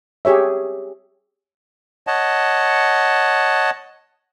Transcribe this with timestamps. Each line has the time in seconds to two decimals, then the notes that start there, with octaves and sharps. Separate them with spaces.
0.25 G4 G#4 C#5 E5
2.07 C#5 D#5 F#5 A5